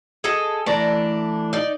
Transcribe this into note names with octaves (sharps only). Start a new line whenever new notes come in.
G#4 A4 D#5
E3 A3 D4 A4 D5 A#5
D#4 D5